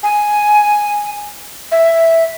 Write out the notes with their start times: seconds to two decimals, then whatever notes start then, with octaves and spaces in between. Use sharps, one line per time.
0.03 G#5
1.72 E5